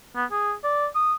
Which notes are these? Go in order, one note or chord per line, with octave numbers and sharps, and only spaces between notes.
B3
G#4
D5
D#6